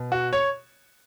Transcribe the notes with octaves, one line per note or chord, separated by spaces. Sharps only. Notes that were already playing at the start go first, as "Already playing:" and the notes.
Already playing: B2
F#4
C#5